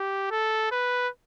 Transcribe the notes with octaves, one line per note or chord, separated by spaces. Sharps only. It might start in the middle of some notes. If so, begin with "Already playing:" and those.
Already playing: G4
A4
B4